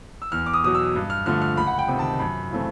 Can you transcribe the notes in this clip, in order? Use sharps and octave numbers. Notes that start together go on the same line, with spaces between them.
E6
E2 F6
D6
D#6
B2 F#3 D#6
E6
G2
F6
D3 F3 A3 F6
F6
C#2 B5
F#5
G5
C3 D#3
A5
F#2 B5
C#3 E3 A3 C4